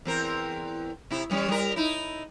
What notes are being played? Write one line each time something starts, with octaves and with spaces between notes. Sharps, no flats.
E2 C4 A#4
C3 E4
E3 G3 C#4
G3 A#4
D#4 E4